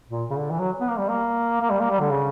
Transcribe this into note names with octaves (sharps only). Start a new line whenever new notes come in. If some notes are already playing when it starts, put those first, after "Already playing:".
A#2
C#3
D3
E3
F#3
B3
A#3
G3
A#3
A#3
G3
A#3
G3
D3
C#3